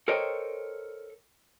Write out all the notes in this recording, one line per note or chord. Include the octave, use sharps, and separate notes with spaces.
A4 A#4 C5 C#5 D#5 G5